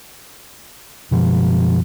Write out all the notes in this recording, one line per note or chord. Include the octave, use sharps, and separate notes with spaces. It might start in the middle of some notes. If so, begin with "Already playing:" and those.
F#2 B2 F3